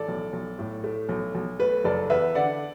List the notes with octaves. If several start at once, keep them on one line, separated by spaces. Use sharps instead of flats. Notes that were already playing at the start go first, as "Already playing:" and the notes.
Already playing: A1 A4 D5
B1
B1
A2
A3
B1
B1
A3 B4
F#1 A4 D5
E2 B4 E5
D3 D5 F#5